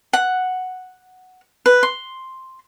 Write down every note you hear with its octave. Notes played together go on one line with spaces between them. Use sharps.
F#5
B4
C6